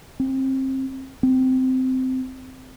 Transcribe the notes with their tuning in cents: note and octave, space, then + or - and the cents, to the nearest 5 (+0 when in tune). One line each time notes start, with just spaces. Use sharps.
C4 +25
C4 -15